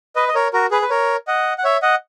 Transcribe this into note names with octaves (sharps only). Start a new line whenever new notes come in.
B4 D#5
D#5
A#4 C#5
F#4 A#4
G#4 B4
B4
A#4 C#5
D#5 F#5
F#5
C#5 E5
D#5 F#5